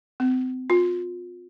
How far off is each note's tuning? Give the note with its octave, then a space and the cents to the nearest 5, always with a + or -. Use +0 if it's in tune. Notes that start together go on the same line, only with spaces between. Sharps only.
C4 -35
F4 +35